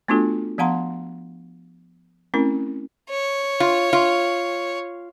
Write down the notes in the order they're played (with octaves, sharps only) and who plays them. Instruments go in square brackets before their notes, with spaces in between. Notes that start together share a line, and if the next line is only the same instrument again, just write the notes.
[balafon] A3 B3 D4 F4 F#4 A4
F3 B3 F5 F#5 A#5 C6
A3 C4 C#4 E4 A#4
[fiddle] C#5
[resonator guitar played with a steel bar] F4
F4